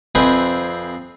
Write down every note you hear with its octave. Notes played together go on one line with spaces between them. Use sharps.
F2 C4 G#4 B4 E5